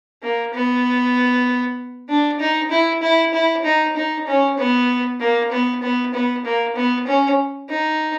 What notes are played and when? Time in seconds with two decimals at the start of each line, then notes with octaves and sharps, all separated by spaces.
0.23 A#3
0.54 B3
2.09 D4
2.40 D#4
2.71 E4
3.03 E4
3.34 E4
3.65 D#4
3.96 D#4
4.27 C#4
4.58 B3
5.21 A#3
5.52 B3
5.83 B3
6.14 B3
6.45 A#3
6.76 B3
7.07 C#4
7.69 D#4